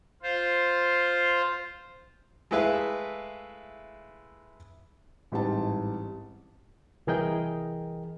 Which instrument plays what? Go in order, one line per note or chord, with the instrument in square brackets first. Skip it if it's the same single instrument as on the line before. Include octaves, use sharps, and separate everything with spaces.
[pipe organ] F4 C5
[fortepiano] G#3 A3 E4 B4 E5 F5
[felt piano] A1 G#2 G3 C4 A5
[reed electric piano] C2 E3 G#4 A#4 D#5 G5